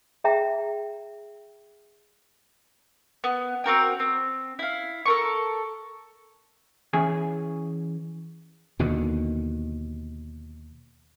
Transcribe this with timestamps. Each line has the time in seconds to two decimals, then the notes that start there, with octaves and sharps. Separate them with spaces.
0.24 G#4 E5 G5 A#5
3.24 B3
3.64 C4 F#4 A#4 G5
4.00 C4
4.59 E4 F5
5.06 A4 A#4 C#6
6.93 E3 C#4 G#4 G#5
8.79 D#2 B2 D3 D#3